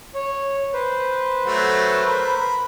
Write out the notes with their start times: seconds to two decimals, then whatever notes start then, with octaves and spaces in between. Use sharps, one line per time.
0.14 C#5
0.73 B4 C5
1.46 F#3 A3 F#4
2.06 A#4 B5